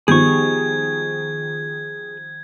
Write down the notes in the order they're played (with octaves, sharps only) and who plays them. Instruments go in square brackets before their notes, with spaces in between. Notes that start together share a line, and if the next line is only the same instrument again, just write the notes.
[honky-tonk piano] D#3 F3 G3 [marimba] B3 G4 [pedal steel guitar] G#4 C#6 [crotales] G#6